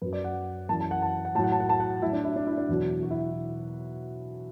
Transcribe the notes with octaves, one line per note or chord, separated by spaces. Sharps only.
F#2 F#3 B4
D5
F#5
F#2 E3 A5
A5
F#5
A5
F#5
A2 F#3 A5
F#5
A5
F#5
A5
F#5
A2 F#3 E4
D4
E4
D4
E4
D4
E2 B2 F#3
F#4
E4